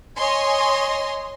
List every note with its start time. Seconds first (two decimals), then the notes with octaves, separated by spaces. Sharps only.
0.17 C#5 D#5 G#5 C6